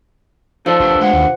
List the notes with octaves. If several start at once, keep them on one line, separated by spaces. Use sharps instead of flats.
F3 D#4 A4 D5 D#5
A#1 B2 D4 G4
G#3 F#5
D#2